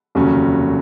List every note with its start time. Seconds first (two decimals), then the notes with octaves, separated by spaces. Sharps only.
0.15 F1 D#2 C#3 F#3 C#4